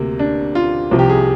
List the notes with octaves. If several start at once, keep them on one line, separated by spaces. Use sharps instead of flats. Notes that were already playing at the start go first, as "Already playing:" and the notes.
Already playing: D2 C3 A#3
D4
F4
C2 C3 F3
G4
G#4